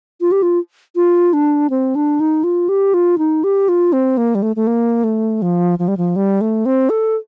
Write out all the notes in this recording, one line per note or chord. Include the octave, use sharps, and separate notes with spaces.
F4
G4
F4
F4
D4
C4
D4
D#4
F4
G4
F4
D#4
G4
F4
C4
A#3
G3
A3
A3
A#3
A3
F3
F3
G3
F3
G3
A3
C4
A4